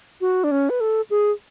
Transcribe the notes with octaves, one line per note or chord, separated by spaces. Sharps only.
F#4
D4
C#4
B4
A4
G#4